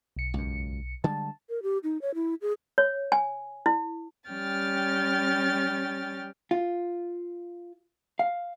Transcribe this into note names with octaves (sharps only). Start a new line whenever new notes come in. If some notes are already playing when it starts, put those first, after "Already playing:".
B1 C#7
C#2 F#2
D3 G3 G#3 A5
A#4
G4
D#4
C#5
E4
G#4
C#5
G#5
E4
G3 C#4 G5 F6 A6
F4
F5